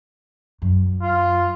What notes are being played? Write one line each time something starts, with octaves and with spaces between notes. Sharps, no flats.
F#2
F4